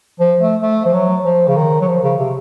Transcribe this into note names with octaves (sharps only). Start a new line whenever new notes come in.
F3
A3
A3
F3
F#3
F3
C#3
D#3
F#3
F3
C#3
C3